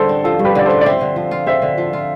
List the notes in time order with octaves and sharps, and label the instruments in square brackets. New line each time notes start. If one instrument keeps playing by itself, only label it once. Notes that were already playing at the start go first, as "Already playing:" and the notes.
Already playing: [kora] G2 D3 [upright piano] A4 C5
[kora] C4
[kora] F3 [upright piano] A4
[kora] G2
[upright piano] G4 B4
[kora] D3 [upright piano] D5
[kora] C4 [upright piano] A4 C5
[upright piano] D5
[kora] C4 [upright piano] C5 E5
[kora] D3
F3
F4
[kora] C4 [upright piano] C5 E5
[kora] D3
F3
F4